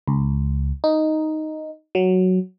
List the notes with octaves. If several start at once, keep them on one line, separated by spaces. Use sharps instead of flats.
C#2
D#4
F#3